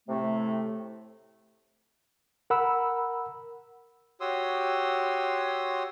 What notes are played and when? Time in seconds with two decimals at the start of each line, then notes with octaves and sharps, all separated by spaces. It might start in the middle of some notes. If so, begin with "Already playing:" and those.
0.09 A2 C3 A3
2.50 A#4 F#5 B5 E6
4.21 F#4 G4 C#5 C6 D#6 E6